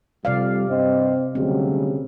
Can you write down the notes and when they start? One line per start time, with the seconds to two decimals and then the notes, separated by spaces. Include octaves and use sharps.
0.25 F2 C3 G3 D5 F5
0.69 G2 C4 D#5
1.35 D2 C#3 F#3 G3 C4